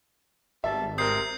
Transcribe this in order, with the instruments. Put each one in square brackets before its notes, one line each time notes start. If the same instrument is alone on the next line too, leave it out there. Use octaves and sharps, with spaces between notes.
[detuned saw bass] G#1 [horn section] B2 G3 A5 [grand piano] E5
[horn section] C3 G3 A#4 [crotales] D#6 G6 C7